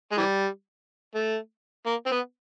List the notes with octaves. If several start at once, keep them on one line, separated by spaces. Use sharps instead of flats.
G#3
E3 G3
A3
A#3
C4
B3